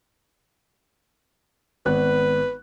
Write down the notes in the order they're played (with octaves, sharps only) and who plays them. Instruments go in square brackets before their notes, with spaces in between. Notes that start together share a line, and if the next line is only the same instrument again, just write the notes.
[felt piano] G#1 B3 F#6 [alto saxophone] B4